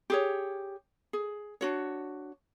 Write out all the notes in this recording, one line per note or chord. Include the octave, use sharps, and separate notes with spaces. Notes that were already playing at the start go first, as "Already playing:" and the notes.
G4 G#4 C#5
G#4
D4 F#4 C#5